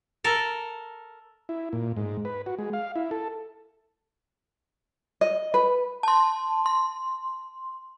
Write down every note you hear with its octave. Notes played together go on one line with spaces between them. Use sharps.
A4 A#4
E4
A#2
G#2
B4
F#4
G#3
F5
E4
A4
D#5
B4
A5 C6
C6